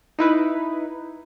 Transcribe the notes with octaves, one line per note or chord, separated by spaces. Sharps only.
D#4 E4 B4